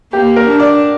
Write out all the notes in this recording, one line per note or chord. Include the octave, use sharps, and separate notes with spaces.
A#3 G4
A#4
D4
D5